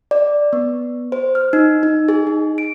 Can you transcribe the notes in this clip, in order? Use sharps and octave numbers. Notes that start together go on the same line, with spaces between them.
D5
B3
C5
F6
D#4
D#4
G#4
D#4
D7